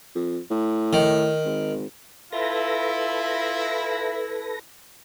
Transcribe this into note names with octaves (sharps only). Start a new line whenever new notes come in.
F2
A2
D#3
G#1
E4 F4 A4 B4 E5 A#6